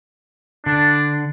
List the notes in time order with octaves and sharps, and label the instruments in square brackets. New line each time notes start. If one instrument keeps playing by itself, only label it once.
[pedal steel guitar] D3 [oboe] D4